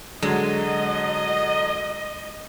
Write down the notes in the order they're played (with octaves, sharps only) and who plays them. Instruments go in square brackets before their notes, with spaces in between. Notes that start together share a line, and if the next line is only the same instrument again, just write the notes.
[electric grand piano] D3 F#3 [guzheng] G#3 [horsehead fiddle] D#5